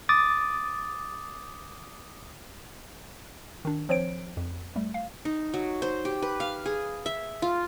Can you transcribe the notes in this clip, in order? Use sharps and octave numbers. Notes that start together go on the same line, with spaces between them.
D6 D#6 A6
D#3 D4
F3 C4 C5 C#5 D7
F2
G3 A3
F5
D#4
F#3
C5
G4
B4
F5
G#4
E5
F4